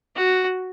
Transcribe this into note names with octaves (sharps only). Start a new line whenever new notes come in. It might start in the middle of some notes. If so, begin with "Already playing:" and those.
F#4